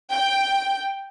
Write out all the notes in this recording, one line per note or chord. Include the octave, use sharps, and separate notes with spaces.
G5